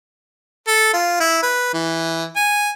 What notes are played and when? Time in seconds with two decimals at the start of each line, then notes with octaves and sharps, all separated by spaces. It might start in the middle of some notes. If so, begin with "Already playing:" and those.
0.68 A4
0.93 F4
1.20 E4
1.43 B4
1.73 E3
2.36 G#5